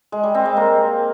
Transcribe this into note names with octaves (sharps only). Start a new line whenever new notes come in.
G#3
G3
C4
G#3
A#3